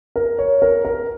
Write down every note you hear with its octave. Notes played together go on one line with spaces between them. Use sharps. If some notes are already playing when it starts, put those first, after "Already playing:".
A#4
C#5
A#4
A#4